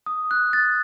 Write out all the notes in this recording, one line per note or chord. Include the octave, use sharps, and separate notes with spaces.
D#6
F#6
A6